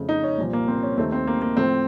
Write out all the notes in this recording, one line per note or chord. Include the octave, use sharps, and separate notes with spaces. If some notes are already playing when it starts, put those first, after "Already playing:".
Already playing: F2 C#3 A3
D#4
C#4
C2 A#2 F3
A#3
C4
C#4
D#2 D#3 A3 C4
C4
A#3
A#3
A2 F3 A3 C4